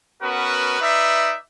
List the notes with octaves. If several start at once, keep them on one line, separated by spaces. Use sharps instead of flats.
B3 C#4 F#4 A#4 B4
D#4 B4 D5 E5